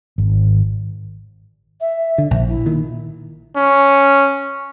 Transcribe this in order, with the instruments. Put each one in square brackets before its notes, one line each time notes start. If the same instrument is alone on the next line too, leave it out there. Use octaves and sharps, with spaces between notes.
[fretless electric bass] G#1
[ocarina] E5
[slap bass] D3
A#1
[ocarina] E4
[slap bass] A#2 D#3
[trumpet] C#4